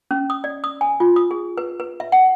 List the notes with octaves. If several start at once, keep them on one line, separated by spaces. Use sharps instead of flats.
C#4
D#6
D5
D#6
G#5
F4
D#6
G#4
B4
B4
E5
F#5